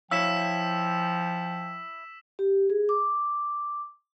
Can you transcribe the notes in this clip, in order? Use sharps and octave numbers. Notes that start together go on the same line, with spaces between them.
F3 E4 C#5 F5 G5 E6 B6 E7
G4
G#4
D6